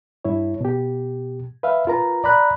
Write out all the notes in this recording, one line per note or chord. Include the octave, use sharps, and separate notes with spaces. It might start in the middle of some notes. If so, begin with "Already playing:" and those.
G2 E4 C#5
B2 G4
B4 E5 F5
F4 A#4 B4 A#5
D5 A#5 B5 F#6